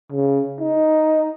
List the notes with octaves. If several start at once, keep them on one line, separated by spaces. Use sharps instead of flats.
C#3
D#4